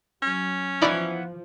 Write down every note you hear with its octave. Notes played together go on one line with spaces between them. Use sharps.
F#3 C#4
E3 F3 B3 D#4 E4 D5